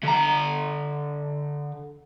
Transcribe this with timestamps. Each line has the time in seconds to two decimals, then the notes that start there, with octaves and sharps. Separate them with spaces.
0.03 D3 A#5